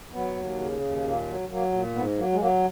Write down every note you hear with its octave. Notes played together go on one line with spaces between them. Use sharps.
F#3 B3
D#2
C#3
D#2
A#2 A#3
F#3
F#3 A#3
A#2
G#2 B3
F#3 A#3
G#3
F#3 A#3